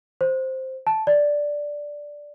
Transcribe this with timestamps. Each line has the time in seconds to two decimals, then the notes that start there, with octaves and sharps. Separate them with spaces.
0.21 C5
0.87 A5
1.07 D5